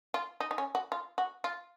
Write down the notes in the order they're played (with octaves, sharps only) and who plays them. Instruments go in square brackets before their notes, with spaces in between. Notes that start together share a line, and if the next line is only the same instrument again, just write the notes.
[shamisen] F4
D#4
D#4
C#4
F#4
F4
F#4
F4